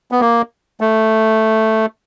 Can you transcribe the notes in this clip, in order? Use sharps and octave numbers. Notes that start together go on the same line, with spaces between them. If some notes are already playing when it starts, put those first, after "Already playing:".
B3
A#3
A3